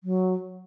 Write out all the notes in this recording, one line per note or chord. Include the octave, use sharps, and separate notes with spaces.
F#3